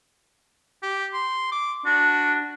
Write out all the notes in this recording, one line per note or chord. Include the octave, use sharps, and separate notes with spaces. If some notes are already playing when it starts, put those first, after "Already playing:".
G4
C6
D6
D4 F#4